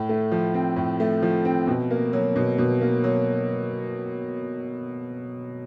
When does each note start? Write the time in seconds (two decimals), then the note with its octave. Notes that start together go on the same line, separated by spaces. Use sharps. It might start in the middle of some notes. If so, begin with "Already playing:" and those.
Already playing: A2
0.09 A3
0.32 F3
0.54 C4
0.76 A2
1.00 A3
1.22 F3
1.45 C4
1.67 B2
1.91 A#3
2.13 F#3
2.36 B2
2.58 B2
2.81 A#3
3.04 F#3